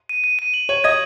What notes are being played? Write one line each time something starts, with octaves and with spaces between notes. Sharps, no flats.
D#7
D#7
D#7
F#7
C#5 F#7
D#5 G#6